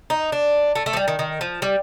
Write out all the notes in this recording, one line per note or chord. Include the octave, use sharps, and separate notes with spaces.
D#4
D4
A3
A3
F3
G3
D#3
D#3
F3
G3